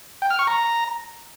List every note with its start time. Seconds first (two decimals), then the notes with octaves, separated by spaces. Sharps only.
0.22 G5
0.30 F6
0.39 C#6
0.47 A#5